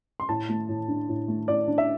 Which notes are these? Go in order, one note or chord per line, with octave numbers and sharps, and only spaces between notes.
C6
A2 A5
A3
A2
D4
A2
A3
A2 D5
D4
E5